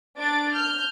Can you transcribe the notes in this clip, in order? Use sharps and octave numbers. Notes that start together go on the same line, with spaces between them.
D4 A6 D7
F6 G6